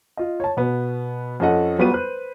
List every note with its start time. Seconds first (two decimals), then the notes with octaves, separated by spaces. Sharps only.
0.17 F4 D#5
0.40 C#5 A5
0.57 B2 B3
1.40 F2 C#4 A4 D#5 F#5
1.78 F#3 G3 B3 F4 C#6 D#7
1.92 B4 C5 F#6